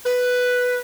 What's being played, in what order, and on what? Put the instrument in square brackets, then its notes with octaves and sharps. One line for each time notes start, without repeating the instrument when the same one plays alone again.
[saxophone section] B4